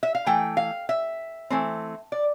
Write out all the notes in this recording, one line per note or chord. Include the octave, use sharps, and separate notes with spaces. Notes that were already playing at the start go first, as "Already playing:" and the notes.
E5
F5
E3 A3 G5
F5
E5
E3 A3 C4
D5